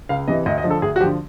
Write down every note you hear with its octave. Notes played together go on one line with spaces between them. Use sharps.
C#2 F5
C3 E3 D#5
D2 D#5
D#5
D3 F3
A4
D2 G#4
F#4
D3 F3 G4